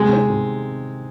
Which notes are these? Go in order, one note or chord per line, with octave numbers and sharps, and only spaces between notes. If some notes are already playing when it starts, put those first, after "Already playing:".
Already playing: C3 G#3
D#3 C4
C3